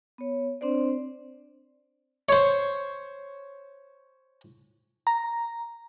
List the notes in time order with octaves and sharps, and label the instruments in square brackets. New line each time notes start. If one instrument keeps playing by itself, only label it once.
[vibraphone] B3 C#5
C4 D4 C5 D5
[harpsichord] C5 C#5
[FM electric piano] A#5